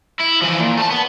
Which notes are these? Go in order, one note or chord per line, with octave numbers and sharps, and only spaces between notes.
E4
E3 F3
A#2
A3 A5
B3